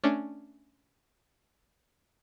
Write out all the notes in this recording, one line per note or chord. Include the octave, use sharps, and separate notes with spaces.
A3 C#4 D4